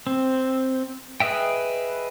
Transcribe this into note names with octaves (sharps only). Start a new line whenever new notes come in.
C4
G#4 B4 D#5 E5 G5